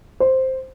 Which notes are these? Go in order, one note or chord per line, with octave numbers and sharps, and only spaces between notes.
C5